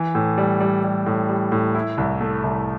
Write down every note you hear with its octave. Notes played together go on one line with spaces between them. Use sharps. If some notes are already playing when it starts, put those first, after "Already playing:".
Already playing: E3
A2
G3
G3
G3
A2
G3
A2
E4
C2
A3
C2